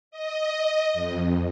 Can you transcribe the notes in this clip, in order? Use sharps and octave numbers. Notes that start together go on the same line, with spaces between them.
D#5
F2